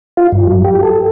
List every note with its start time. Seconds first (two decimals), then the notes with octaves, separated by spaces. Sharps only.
0.17 F4
0.32 G2
0.47 F#3
0.64 G4
0.83 A4